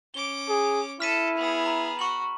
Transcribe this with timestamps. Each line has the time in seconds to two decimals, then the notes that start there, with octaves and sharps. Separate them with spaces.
0.14 C#4 D6 G7
0.49 G#4
1.00 E4 A4 F6 B6 D#7
1.37 B3 G#4
1.66 A#5 B5
1.99 F#4 C#6 F#7